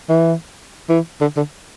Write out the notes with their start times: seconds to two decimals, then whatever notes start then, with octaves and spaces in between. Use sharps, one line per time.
0.09 E3
0.89 E3
1.21 D3
1.37 D3